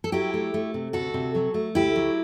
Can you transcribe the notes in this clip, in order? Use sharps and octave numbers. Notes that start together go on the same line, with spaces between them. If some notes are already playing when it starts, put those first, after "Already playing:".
A4
F#3 E4 G4
A3
A3
C3
D2 F#4 A4
C3
F#3
A3
D2 E4 G4
F#3